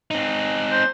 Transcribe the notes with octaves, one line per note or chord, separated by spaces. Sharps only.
C4 D#4
C5